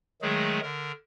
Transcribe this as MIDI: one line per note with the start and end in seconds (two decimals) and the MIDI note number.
0.22 0.60 51
0.22 0.60 54
0.22 0.60 56
0.22 0.60 57
0.22 0.60 68
0.63 0.92 50
0.63 0.92 70